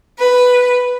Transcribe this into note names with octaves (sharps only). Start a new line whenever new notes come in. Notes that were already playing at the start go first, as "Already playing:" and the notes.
B4